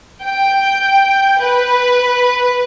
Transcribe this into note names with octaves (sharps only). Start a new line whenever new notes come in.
G5
B4